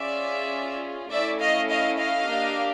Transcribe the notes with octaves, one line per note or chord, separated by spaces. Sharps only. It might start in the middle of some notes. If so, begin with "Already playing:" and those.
Already playing: C#4 F4 G#4 D5 E5
A3 C#4 E4 D5 E5
D#5 F5
D#5 F5
D#5 F5
A#3 D4 G4